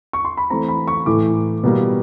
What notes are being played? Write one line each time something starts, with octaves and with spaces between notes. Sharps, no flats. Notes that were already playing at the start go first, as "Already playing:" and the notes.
C#6
C6
B5
E3 A3 C4 A#5
B5
C#6
A2 E3 A3 D6
B2 G3 A#3